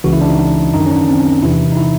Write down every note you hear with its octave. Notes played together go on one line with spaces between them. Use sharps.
C#2 C#3 E3 F#4
E4
D4
D#4
F#2 D#3 D#4
C#4
D4
C4
E2 C3 E3 E4
D#4
E4